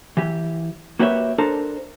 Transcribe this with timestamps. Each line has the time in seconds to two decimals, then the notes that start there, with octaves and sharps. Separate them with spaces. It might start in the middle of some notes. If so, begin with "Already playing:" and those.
0.17 E3 G4
0.99 A#3 F#4 G4 B4 C#5 E5
1.38 D4 A4 A#4 C5